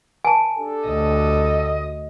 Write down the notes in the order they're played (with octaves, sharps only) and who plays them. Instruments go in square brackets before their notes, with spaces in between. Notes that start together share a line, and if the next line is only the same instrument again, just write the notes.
[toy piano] G#5 A5
[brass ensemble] D4 G4 A4
[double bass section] D2 [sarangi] D#5